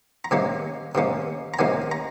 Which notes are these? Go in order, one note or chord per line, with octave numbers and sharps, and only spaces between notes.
A#5
C3 D#3 A#3 C#4 G#5
C3 D#3 A#3 C#4
A#5
C3 D#3 A#3 C#4 G#5
A#5